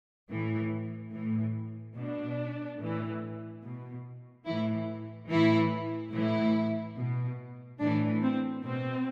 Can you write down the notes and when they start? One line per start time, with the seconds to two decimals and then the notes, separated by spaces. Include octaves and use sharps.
0.29 A2 E3
1.12 A2 E3
1.96 B2 D4
2.80 A2 E3
3.64 B2
4.46 A2 E3 E4
5.29 A2 E3 E4
6.13 A2 E3 E4
6.97 B2
7.80 A2 E3 D4
8.21 C4
8.64 B2 C4